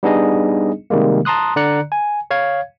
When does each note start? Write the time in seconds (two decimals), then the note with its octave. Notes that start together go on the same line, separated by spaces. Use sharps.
0.03 G3 B3 D4 D#4 G#4 D#5
0.90 C3 D#3 G3 G#3 A#3
1.25 A5 A#5 C6 D#6 F#6
1.56 D3 D5 A#5 F#6 C#7
1.92 G#5
2.31 C#5 F5 G#6